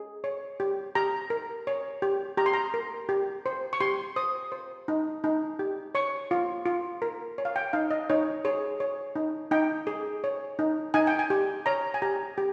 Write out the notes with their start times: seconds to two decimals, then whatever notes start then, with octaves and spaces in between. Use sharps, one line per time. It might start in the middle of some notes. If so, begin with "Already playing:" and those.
Already playing: G#4
0.24 C#5
0.60 G4
0.95 G4 A#5
1.30 A#4
1.67 C#5
2.02 G4
2.37 G4 A#5
2.46 C6
2.53 A#5
2.74 A#4
3.09 G4
3.46 C5
3.73 C#6
3.80 G4 C6
4.16 C5 D#6
4.52 C5
4.88 D#4
5.24 D#4
5.59 G4
5.95 C#5 C#6
6.31 F4
6.66 F4
7.02 A#4
7.38 C#5
7.45 F5
7.56 G5
7.73 D#4 F5
7.91 D#5
8.10 D#4 C#5
8.45 G#4 C#5
8.80 C#5
9.16 D#4
9.51 D#4 G5
9.87 G#4
10.24 C#5
10.59 D#4
10.94 D#4 G#5
11.07 G5
11.19 G#5
11.30 G4
11.66 C#5 A#5
11.94 G#5
12.02 G4 A#5
12.38 G4